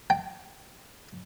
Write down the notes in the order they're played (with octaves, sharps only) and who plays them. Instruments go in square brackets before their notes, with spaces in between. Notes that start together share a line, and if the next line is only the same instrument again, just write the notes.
[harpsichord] G5